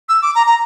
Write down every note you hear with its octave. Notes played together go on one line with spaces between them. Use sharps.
E6
D6
A#5
A#5